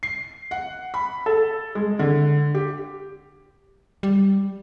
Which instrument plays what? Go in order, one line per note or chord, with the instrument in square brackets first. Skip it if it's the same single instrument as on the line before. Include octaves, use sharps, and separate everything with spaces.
[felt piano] C7
F#5
B5
A4
G#3
D3
G4
[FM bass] G3